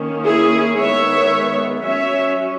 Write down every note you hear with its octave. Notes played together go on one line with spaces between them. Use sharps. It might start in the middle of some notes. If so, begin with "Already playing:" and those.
Already playing: D#3 A#3 C#4
E4 G#4
D#3 G#3 B3 C#5 E5
F#3 C#4 C#5 E5